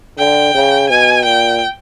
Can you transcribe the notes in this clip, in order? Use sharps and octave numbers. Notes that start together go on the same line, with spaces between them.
D3 G5
C#3
B2 G#5
A#2 G5